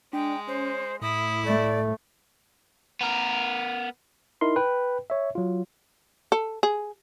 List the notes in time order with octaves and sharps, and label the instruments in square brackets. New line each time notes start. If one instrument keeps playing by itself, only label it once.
[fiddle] G#3 [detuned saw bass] D4 [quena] G5
[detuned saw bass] C#4 [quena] C5
[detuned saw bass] A2 [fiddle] E4 [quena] D#6
[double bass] A3 [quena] D5
[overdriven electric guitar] B3 A#4
[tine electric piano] D#4 E4 A#4 C6
B4 G5
C#5 E5
F#3 F4
[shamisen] A4
G#4